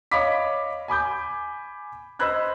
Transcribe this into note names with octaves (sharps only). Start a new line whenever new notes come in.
C#5 D#5 F5 B5 D6 B6
G#5 B5 D6 G6
C5 D#5 B5 E6 F#6 G#6